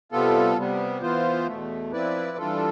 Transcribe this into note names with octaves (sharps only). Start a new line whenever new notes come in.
C3 G3 B3 F4 A4
C3 G3 B3
E3 B3 F4 C5
E2 B2 A3
F3 C4 E4 B4 D5
E3 G3 D4 F4 A4